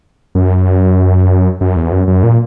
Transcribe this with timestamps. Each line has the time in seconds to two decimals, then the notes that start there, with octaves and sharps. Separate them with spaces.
0.35 F#2
1.61 F#2
1.76 E2
1.92 F#2
2.07 F#2
2.23 A#2